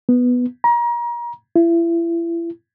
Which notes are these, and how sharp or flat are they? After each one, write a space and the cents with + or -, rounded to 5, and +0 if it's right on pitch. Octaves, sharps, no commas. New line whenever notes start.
B3 +0
A#5 +30
E4 +35